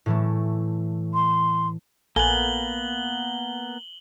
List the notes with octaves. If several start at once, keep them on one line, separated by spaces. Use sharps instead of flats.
A2 E3 A3
C6
A#1 A#3 B3 A4 G#5 F#7 G7